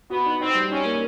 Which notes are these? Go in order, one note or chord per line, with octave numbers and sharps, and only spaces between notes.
B3 F#4
D#4
C4 D#4
G3
C#4 D#4
A#3